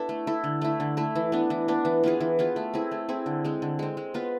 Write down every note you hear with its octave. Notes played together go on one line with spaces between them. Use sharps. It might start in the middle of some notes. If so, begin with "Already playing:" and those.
Already playing: B3 D4 E4 A4
A3
E4 A4
D3
A3 E4
D3
A3 E4
E3
B3 D4
E3
B3 D4
E3
B3 F4 G#4
E3
B3 F4 G#4
A3
C4 E4 G#4
A3
C4 E4 G#4
D3
G#3 C4
D3
G#3 C4
G#3
B3 F4 B4